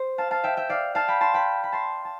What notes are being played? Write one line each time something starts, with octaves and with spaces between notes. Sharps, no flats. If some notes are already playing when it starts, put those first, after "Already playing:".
Already playing: C5
F5 A5
F5 A5
E5 G5
E5 G5
D5 F5
F5 A5
G5 B5
A5 C6
G5 B5
B5
A5 C6
A5